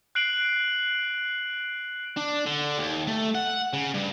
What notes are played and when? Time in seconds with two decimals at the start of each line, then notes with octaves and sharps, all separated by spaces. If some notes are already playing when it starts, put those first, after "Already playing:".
0.15 F#6 C7 D7 F#7
2.17 D4
2.46 D3
2.78 D#2
3.07 A3
3.35 F#5
3.73 C#3
3.94 G2